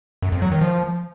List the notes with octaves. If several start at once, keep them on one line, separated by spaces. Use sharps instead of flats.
F#2
F2
F#3
D#3
F3